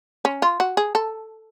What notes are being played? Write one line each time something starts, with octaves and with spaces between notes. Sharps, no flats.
C#4
F4
F#4
G#4
A4